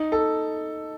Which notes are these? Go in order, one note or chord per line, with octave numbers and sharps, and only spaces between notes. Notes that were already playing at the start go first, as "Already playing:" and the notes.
Already playing: D#4
A4